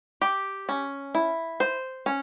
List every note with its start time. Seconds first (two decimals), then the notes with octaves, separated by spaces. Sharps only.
0.22 G4
0.69 C#4
1.15 E4
1.60 C5
2.06 C#4